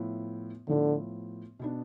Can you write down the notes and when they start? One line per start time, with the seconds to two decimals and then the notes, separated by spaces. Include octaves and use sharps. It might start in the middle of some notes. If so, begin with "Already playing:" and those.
Already playing: A2 F3 B3 E4
0.68 A2 D3 F3 B3 E4
1.59 B2 B3 D4